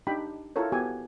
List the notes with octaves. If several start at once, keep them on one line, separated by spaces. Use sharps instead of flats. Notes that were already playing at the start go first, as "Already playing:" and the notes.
D4 D#4 G4 G5 B5
E4 F4 A4 A#4 C#5
B3 F#4 G4 G#5